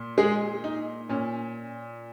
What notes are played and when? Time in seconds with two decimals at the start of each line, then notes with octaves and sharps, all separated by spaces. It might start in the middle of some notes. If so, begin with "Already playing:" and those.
Already playing: A#2
0.18 G#3 G#4
0.64 D#4
1.09 A#2 C#4